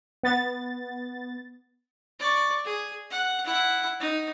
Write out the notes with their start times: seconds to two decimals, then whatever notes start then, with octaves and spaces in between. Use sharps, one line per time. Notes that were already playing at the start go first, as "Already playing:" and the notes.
0.23 B3 A6
2.19 D5 C#6
2.64 G#4
3.10 F#5
3.45 E4 F#5
4.00 D#4